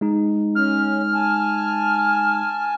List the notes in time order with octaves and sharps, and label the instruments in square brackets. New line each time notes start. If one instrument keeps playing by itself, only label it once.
[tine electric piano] G#3 D#4
[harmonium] C#4 [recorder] F6
[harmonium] G#5 A5